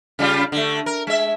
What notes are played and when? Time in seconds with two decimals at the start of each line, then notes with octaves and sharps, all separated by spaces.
0.19 C#3 G3 F4
0.52 D3 A3
0.86 A#4
1.07 G#3 E5